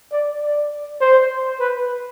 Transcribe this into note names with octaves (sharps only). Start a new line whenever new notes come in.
D5
D5
C5
B4